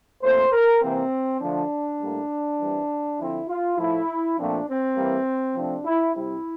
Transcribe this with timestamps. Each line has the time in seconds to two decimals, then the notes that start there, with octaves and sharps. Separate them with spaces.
0.22 A#2 A3 C4 C5
0.52 A#4
0.81 C3 E3 A#3 C4
1.41 D3 F3 A3 D4
2.00 A2 G3 A#3
2.59 E3 G3 C4
3.19 D3 F3 C4 E4
3.48 F4
3.78 A2 F3 A3 E4
4.37 A#2 F3 A3 C4 D4
4.67 C4
4.96 E3 G3 A#3
5.56 C3 F3 A3 C4 D4
5.85 E4
6.15 C3 G3 C4 E4